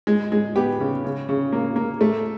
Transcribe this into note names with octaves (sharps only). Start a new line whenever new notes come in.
G#3
G#3
B3 G4
C#3
C#3
C#3
A#3
A#3
A3